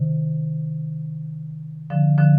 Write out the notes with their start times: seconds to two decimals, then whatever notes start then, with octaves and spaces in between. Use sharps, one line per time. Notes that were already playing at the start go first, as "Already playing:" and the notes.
Already playing: C3 D#3
1.90 D3 F3
2.18 D3 F3